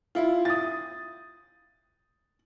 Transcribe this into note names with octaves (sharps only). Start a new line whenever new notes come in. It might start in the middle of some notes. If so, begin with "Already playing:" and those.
E4 F4
D#6 A6